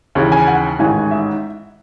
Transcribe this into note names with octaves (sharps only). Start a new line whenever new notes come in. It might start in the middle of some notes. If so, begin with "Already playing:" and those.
D#2 C#3 E3
G#5
F#5
A1 G#2 D#3 G#5
E5